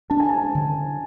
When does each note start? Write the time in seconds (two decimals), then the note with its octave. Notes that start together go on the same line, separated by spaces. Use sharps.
0.10 D4 A5
0.20 G#5
0.29 A5
0.55 D3